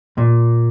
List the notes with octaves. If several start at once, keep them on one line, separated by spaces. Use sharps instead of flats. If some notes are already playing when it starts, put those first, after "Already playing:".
A#2